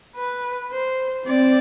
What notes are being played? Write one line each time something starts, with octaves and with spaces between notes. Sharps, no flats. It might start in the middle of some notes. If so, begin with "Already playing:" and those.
B4
C5
C4 D5